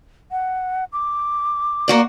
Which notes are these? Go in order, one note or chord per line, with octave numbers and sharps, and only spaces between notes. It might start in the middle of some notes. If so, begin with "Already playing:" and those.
F#5
D6
A#3 F#4 D5